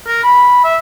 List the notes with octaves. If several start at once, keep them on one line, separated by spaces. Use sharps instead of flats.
A#4
B5
E5